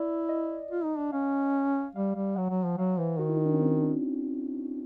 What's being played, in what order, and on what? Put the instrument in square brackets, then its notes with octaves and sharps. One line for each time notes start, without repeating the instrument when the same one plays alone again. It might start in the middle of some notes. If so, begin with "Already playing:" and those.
Already playing: [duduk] E4 [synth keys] D5
[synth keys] D#5
[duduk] F4
D#4
D4
[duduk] C#4 [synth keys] F5
[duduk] G3 [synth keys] F5
[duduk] G3
[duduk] F#3 [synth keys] F#5
[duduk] F#3
F3
[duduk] F#3 [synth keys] F5
[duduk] E3 [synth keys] C5
[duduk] D#3 [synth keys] F#4
[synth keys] E4
D#4
D4
C#4
C4
D4